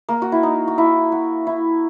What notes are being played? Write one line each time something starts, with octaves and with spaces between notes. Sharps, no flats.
A#3
F#4
E4
D#4
F#4
E4
F#4
E4